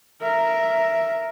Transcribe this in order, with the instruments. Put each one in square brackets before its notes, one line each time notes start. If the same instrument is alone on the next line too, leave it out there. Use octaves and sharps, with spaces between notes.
[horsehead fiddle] A#4 E5